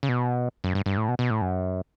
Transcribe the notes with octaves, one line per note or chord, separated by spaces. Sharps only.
C#3
B2
F#2
G2
G2
A2
B2
B2
A2
F#2